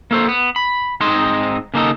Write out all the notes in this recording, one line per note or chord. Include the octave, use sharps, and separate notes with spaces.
A#3 A4 C5
B3
B5
G#2 C4 D#4 C5 D#5 C6
C#3 A#3 D#4 A4 D#5